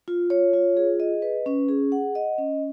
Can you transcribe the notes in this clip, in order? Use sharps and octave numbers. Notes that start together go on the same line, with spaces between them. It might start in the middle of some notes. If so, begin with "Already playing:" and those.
F4
C#5
F4
G#4
D#5
B4
C#4
G#4
F#5
D#5
C#4